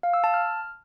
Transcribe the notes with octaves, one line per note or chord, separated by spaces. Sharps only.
F5
E6
A5
F6